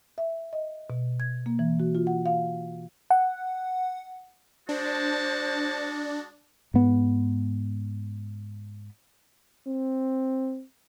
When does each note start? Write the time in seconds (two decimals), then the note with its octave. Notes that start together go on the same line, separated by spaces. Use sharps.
0.18 E5
0.53 D#5
0.90 B2
1.20 G#6
1.46 A#3
1.59 E3
1.80 F#4
1.95 F4
2.07 F#5
2.26 F5
3.11 F#5
4.69 G#3 D4 F#4 C5 A5
6.74 G#2 B3
9.67 C4